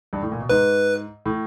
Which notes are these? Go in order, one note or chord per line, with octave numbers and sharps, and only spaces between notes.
G2
A2
A#2
B2
G#2 B4
A2